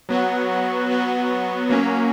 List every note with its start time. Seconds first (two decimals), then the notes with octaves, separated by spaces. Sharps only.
0.09 F#3 B3 F#4
0.89 F#3 B3 F#4
1.69 F#3 A#3 C#4